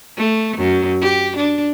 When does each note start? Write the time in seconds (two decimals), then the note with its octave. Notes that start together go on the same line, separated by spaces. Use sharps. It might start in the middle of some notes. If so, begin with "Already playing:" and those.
0.17 A3
0.56 F#2
1.01 G4
1.36 D4